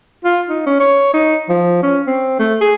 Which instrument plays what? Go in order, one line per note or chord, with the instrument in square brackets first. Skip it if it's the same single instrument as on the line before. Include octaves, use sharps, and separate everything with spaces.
[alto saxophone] F4
D#4
C#4
C#5
D#4
F3
C#4
C4
A3
G#4